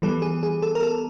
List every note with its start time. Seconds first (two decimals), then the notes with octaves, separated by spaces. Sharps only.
0.02 E3 G3 B3 A4
0.22 G#4
0.43 G#4
0.62 A4
0.75 A#4
0.83 A4